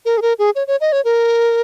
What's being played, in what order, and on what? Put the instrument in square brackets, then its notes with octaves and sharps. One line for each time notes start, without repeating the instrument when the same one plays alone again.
[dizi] A#4
G#4
A#4
G#4
C#5
C#5
D#5
C#5
A#4